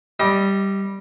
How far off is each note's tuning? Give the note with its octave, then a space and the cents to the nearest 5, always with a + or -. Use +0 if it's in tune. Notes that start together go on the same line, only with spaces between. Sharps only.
G3 +0 D#5 +25